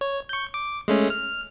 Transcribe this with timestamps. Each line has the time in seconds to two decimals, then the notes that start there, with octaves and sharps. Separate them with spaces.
0.01 C#5
0.29 C#6 G6
0.54 D6
0.88 G#3 A3 C#4
1.10 F6